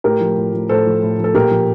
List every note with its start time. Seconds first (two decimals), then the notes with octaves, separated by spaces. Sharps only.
0.04 A2 G4 A#4
0.21 F3
0.37 A2
0.54 F3
0.69 A2 A4 C5
0.87 F3
1.02 A2
1.19 F3
1.24 A4
1.35 A#2 G4 A#4
1.51 F3